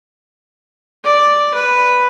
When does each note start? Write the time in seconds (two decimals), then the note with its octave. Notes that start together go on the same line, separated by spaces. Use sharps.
1.04 D5
1.54 B4